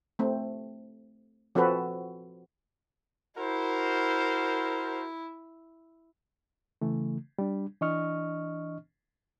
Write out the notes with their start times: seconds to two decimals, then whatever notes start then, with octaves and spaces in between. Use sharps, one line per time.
0.19 A3 C4
1.55 F3 C4 F#4 A4 B4
3.37 E4 F#4 A#4 C5
6.81 C#3 E3 A3
7.39 G3 D4
7.81 E3 D4 D#5 C#6 F6